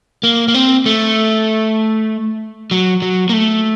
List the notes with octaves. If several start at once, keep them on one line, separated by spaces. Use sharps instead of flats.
A#3
A#3
C4
A3
F#3
F#3
A#3
A3